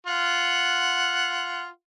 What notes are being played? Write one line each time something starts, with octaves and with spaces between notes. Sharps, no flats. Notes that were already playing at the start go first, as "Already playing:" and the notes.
F4 F#5